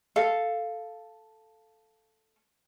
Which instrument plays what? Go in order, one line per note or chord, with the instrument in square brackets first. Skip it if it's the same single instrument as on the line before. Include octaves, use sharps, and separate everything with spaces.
[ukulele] A4 F5